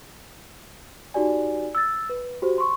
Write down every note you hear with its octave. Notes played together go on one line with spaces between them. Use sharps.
D#4 F#4 G4 D5 G#5
E6 A6
B4
F#4 G4 C5
C6 C#6